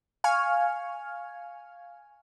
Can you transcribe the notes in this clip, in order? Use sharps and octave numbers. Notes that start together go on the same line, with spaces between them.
F5 G#5 C#6 F6